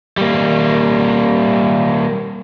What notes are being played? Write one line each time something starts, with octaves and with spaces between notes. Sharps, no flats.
G3 A#3